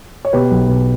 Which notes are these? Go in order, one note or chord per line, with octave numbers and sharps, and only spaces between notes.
C#5
B2 G4 B4
B1
B2